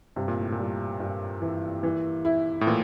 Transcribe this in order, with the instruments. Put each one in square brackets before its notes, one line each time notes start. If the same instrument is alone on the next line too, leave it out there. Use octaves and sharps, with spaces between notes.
[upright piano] G2 [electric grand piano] C3
[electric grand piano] A#2
A2
A#2
[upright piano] G3
G2
E3
E3
E4
[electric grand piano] A2
[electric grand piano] A#2 [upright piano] E3